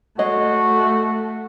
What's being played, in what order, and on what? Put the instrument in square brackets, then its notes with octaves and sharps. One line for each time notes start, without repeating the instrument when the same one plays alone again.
[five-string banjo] G#3 C#5 D#5 [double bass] A3 [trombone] F#4